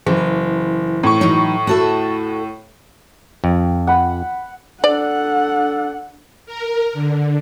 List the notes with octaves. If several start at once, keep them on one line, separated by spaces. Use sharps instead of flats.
F#1 E3
A2 C#6
E3 F#3 D#4
F#4 A4 E5
F2
F#5 B5
D4 A4 D5 F#5
A#4
D3